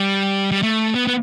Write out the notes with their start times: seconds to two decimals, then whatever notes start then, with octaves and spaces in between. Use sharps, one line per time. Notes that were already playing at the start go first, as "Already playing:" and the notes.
Already playing: G3
0.52 G3
0.63 A3
0.95 B3
1.07 B3